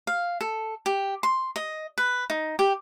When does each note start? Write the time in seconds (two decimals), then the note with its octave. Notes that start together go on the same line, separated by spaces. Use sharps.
0.07 F5
0.41 A4
0.86 G4
1.23 C6
1.56 D#5
1.98 B4
2.30 D#4
2.59 G4